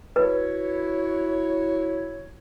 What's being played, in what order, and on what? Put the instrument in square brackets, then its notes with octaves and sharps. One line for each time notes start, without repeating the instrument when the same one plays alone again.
[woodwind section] E4 F#4 C#5 [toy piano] B4